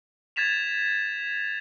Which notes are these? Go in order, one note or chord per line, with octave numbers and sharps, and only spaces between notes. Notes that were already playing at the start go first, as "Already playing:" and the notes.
G#6 A6 B6 E7 F7